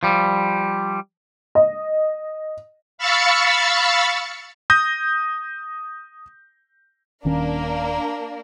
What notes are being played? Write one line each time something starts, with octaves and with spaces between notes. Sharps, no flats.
F3 G3
D#5
F5 B5 C#6 E6 A6 C#7
D#6 G6 A#6
D#1 D#3 A#3 C#4 D4 A#4